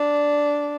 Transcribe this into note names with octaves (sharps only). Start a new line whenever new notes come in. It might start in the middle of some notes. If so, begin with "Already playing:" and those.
Already playing: D4